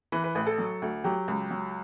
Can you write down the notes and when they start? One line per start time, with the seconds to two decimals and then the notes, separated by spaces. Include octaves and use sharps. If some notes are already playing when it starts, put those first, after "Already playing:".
0.12 E3 B4
0.24 B4
0.35 A1 B4
0.47 A4
0.58 F#3
0.82 D2
1.04 F#3 G4
1.28 C#2
1.51 F#3